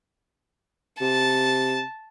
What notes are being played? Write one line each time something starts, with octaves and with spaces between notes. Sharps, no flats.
C3 A5